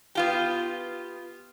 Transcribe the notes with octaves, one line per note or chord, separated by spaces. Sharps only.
B3 F4 G4